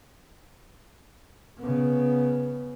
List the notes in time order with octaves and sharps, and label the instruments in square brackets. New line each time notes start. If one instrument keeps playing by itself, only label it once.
[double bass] C#3 B3